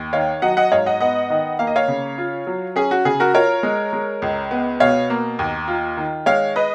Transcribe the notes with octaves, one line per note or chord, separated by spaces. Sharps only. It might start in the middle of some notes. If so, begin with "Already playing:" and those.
Already playing: D#2
D#3 C#5 F5
F#3 D#5 F#5
D#5 F#5
G#2 C#5 F5
D#5 F#5
B3 D#5 F#5
D#3
A#3 F5
D#5
C#5 F5
C#3
F4
F#3
C#4 G#4
F#4
C#3 G#4
F#4 A#4
F4 A#4 C#5
G#3
G#3
C#2
B3
B2 C#5 F5
A#3
D#2
F4
D#3
G#3 C#5 F5
B4 D#5